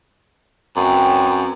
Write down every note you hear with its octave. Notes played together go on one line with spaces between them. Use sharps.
F#2 C4 C#4 B4